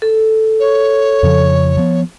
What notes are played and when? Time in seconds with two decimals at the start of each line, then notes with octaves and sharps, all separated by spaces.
0.02 A4
0.60 C#5
1.23 F2 C#3 F3
1.77 F3 B3